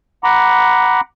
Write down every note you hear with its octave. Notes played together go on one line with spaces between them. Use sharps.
F#5 A#5 B5 D6